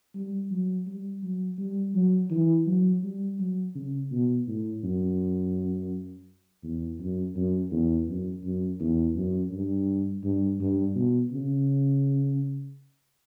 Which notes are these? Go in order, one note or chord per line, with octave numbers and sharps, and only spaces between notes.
G3
F#3
G3
F#3
G3
F#3
E3
F#3
G3
F#3
C#3
B2
A2
F#2
E2
F#2
F#2
E2
F#2
F#2
E2
F#2
G2
G2
G2
B2
C#3